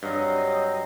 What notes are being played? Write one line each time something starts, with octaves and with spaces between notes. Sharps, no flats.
G2 F#3 C4 C#5 D#5 F5